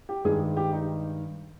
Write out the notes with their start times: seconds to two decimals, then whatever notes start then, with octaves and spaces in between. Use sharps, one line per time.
0.09 G4
0.24 G2 D#3 G#3 G#4
0.57 G4
0.73 D#4